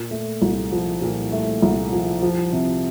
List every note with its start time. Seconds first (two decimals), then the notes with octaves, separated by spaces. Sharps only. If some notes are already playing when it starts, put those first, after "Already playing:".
Already playing: A#2
0.11 A3
0.42 C2
0.72 F3
1.02 A#2
1.32 A3
1.62 C2
1.93 F3
2.22 F3
2.53 C3